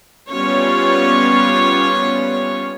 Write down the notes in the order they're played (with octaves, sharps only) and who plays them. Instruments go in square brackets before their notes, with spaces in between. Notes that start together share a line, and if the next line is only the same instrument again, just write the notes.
[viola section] G3 B3 C#4 F4 C#5